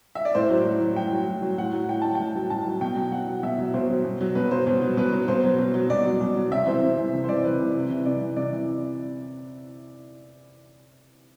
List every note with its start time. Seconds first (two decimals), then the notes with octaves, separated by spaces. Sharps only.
0.15 E5
0.25 D5
0.35 A2 C5
0.50 F#3
0.65 A2
0.81 F#3
0.96 A2 G5
1.12 F#3
1.27 A2
1.42 F#3
1.58 A2 F#5
1.73 F#3
1.89 A2 G5
2.02 F#3 A5
2.15 A2 G5
2.36 F#3
2.50 A2 A5
2.66 F#3
2.81 B2 G5
2.96 F#3
3.12 B2 F#5
3.28 F#3
3.43 B2 E5
3.59 F#3
3.74 B2 C5
3.90 F#3
4.05 B2
4.21 F#3
4.35 B2 B4
4.51 F#3 C5
4.67 B2
4.82 F#3
4.97 B2 B4
5.12 F#3
5.28 B2 C5
5.44 F#3
5.59 B2
5.74 F#3
5.90 B2 D5
6.05 F#3
6.21 B2
6.36 F#3
6.51 C3 E5
6.67 E3 C5
6.82 C3
6.97 E3
7.13 C3
7.24 C5
7.29 E3 D5
7.44 C3 B4
7.59 E3
7.74 C3
7.90 E3
8.06 C3 D5
8.21 E3
8.37 C3 D5
8.52 E3